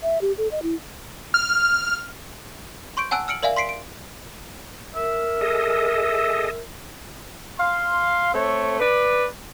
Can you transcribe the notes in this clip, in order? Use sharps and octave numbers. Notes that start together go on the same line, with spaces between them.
E5
G4
A4
D#5
E4
F6
C6 C#6 G6 D7
F#5 G#5 A5 E6 F#6 D7
E6 F6 C#7 D7 F#7
A#4 D5 E5 F5 G#5
C6 B6 C7 D7
D7
A#4 E5
G#4 A4 D#5
F5 C6
A3 C4 A4 C#5
B4 D5